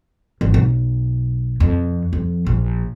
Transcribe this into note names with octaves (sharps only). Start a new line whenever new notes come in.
G#1
B1
F2
F2
A#1